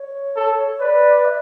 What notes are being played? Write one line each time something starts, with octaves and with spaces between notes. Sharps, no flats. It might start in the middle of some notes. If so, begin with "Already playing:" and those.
Already playing: C#5
A4
B4 D5
E5